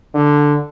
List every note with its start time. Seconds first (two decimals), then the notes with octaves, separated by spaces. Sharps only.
0.14 D3